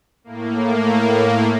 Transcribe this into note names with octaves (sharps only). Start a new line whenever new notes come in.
A2 A#3